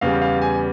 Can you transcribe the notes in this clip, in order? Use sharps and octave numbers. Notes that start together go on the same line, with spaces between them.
E2 C#3 G3 F5
F5
G#5